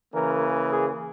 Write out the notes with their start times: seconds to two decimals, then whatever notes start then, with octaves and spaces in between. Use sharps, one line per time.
0.14 C#3 E3 A#3 A#4
0.70 G#4